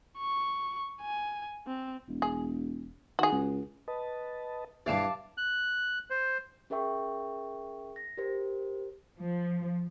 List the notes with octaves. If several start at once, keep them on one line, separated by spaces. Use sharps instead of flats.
C#6
G#5
C4
E1
G#4
D#3 F#4 G#4
C#2
B4 D#5 A5
G2 E3 D5 F5 A5
F#6
C5
C#4 G#4 A#4 E5 G5 C#6
A#6
G4 A#4 C5
F3